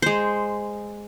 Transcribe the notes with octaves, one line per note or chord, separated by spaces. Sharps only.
G#3 C5